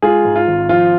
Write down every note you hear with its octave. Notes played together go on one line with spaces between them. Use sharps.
G#3 F4 G#4
G#2
F4
G#1
F3 F4